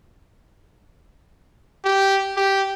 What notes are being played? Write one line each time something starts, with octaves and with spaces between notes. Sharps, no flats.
G4
G4